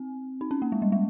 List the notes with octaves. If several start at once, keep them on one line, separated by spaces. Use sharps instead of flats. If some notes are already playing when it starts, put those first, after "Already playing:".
Already playing: C4
D#4
C#4
A#3
G#3
G3
G#3